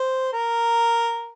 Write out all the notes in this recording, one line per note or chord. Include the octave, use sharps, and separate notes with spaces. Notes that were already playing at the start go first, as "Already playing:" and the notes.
Already playing: C5
A#4